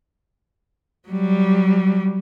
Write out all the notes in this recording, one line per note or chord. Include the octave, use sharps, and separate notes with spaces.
F#3 G3